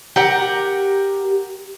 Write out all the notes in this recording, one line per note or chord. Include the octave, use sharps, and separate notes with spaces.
G4 A#4 F#5